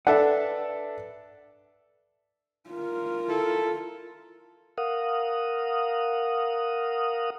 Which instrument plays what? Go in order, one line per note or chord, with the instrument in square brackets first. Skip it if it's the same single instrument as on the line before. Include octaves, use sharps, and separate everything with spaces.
[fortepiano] D4 A4 E5 [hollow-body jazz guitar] B4 F#5
[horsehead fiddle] F4 A#4
[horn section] E4 A4
[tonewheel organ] A#4 F5 F#5 D#6